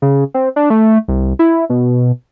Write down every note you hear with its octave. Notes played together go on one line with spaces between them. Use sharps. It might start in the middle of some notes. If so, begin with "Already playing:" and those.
C#3
C4
D4
A3
C2
E4
B2